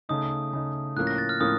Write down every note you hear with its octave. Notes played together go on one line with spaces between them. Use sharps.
C#3 A3 D#4 D#6
C#3 A3 D#4
A2 F3 A#3 C#4 F#6
A#6
A6
F6
A2 F3 A#3 C#4 D#6